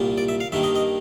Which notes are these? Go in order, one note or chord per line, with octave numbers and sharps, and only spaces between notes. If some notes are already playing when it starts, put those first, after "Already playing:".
Already playing: C2 A#2 G3 A#3
D5
E5
F5
G2 D#3 G3 A#3 E5
D#5
D#5